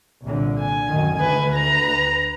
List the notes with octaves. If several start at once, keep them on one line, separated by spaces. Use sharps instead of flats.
C2 A#2 D3
G#5
F#2 A2 D#3
D2 B4 G#5
B4 A#5